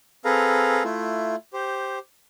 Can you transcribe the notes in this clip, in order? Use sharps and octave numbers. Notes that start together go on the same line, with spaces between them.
C4 G#4 A4 B4 F5 A#5
A3 E4 F4
G4 C5